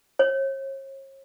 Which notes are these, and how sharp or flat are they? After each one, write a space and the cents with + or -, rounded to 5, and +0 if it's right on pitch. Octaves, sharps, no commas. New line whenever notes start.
C#5 -40